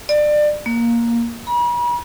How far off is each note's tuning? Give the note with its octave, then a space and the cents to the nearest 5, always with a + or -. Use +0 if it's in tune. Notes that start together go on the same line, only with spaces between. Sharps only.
D5 +25
A#3 +5
B5 -45